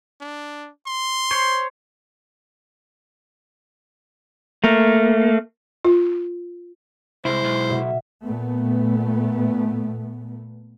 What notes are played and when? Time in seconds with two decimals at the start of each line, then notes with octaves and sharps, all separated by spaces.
0.21 D4
0.87 C6
1.31 C5 C#5
4.64 A3 A#3
5.85 F4
7.25 C2 G#3 E4 C5
7.44 B1
7.70 B2 E5
8.24 A#2 A3 B3